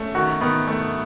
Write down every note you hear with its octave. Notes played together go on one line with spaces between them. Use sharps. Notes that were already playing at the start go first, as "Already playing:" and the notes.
Already playing: A3 C#4
D#3 F#4
D#3 B3
A3